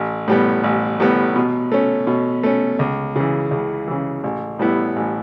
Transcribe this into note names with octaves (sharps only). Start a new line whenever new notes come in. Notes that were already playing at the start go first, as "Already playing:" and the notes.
Already playing: A1
A2 G3 B3
A1
A2 G3 B3
B2
A3 C#4
B2
A3 C#4
C#2
C#3 E3
C#2
C#3 E3
A1
A2 G3 B3 E4
A1